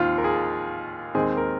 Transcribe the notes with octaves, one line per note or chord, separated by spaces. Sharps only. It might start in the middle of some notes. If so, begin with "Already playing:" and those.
Already playing: D#2 D#3 C4 F4
A#4
G#4
D#2 D#3 G#3 C4 G#4
A#4